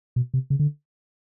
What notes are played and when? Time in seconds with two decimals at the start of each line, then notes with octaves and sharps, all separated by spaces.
0.16 B2
0.34 C3
0.50 C#3
0.59 D3